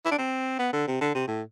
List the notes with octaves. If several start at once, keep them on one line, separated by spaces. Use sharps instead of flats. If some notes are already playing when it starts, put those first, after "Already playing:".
E4
D4
C4
B3
D3
C3
D3
C3
A2